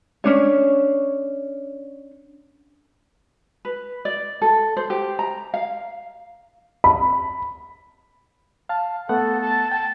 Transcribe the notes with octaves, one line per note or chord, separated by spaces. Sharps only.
C#4 D4 C#5
B4
D5
A4
C5
G4
A#5
F5
B5
F5 A5
A3 B3 A4 F#5
A5
G5 A5